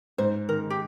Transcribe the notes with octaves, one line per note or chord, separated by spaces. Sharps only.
G#2 C5
D#3 A#4
G4